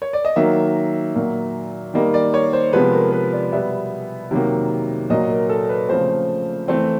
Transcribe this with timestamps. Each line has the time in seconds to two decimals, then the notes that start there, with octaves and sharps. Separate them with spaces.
0.02 C#5
0.13 D5
0.25 D#5
0.36 D#3 F#3 A#3 E5
1.15 A#2 F#3 A#3
1.94 D#3 G3 A#3 D#5
2.14 D5
2.34 C#5
2.53 C5
2.73 C3 F3 G#3 B3 B4
2.93 A#4
3.13 B4
3.33 D5
3.52 B2 G3 B3 E5
4.31 C3 D#3 F#3 A#3
5.10 A#2 F#3 A#3 D#5
5.30 A#4
5.49 A4
5.69 B4
5.89 C#3 F3 A3 C4 C5
6.68 E3 A3 C4